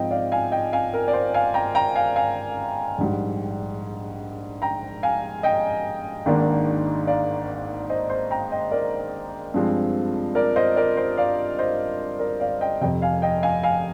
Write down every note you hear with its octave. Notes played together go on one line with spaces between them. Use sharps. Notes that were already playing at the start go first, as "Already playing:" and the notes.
Already playing: G#2 F3 C4 D#4 D#5 G5
D5 F5
F5 G#5
D#5 G5
F5 G#5
A#4
D5
C5
F5 G#5
G5 A#5
G5 A#5
F5 G#5
F5 G#5
A#1 G#2 G3
G5 A#5
F5 G#5
D#5 G5
G#1 G#2 D#3 A#3 D4
D5 F5
C5 D#5
C5
G5 A#5
D#5 G5
A#4 D5
G2 F3 G#3 C4
A#4 D5
C5 D#5
A#4 D5
C5
D5 F5
C5 D#5
A#4 D5
D5 F5
D#5 G5
F1 F2 C3 D#5 G5
F5 G#5
D#5 G5
F5 G#5
F5 G#5